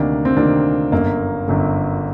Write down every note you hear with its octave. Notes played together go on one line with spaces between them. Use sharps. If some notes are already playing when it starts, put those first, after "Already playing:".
Already playing: D2 C3 D#3 A#3 D4
C4
D2 C3 D#3 A#3 D4
G1 F#2 D3 A#3
G1 F#2 D3